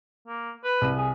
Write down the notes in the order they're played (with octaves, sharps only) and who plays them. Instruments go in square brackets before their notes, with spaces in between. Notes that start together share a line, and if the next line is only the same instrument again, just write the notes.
[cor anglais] A#3
B4
[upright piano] C2 D#7
[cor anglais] G#4